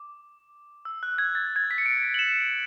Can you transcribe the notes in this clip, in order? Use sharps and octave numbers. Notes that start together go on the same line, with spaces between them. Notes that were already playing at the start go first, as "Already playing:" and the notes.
Already playing: D6
E6
F#6
G#6
A6
G#6
A6
B6
C#7
D7
F#7
E7